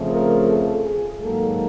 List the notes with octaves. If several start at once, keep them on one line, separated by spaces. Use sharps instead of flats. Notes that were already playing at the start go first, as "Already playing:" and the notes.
Already playing: F2 C#3 F3 A3
A#4
A4
G#4
G#2 D#3 F#3 A#3 A4